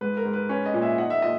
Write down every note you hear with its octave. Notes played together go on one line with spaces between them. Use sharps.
G#2 B4
A#4
G#2
B4
C#4 B4
D#5
A#2
E5
D#4 F#5
E5
A#2 D#5